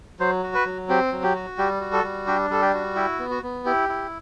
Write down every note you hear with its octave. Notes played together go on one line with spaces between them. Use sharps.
F#3 C5
F#4
B4
F#3
C4 G4
F#3
G4
F#4
G3 G4
F#4
A4
G3
D4 G4
G3 A4
G4
F#4
E4 G4
B3
F#4
B3
E4 G4
E4